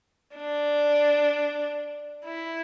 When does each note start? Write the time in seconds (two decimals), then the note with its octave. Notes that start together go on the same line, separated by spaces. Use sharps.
0.36 D4
2.25 E4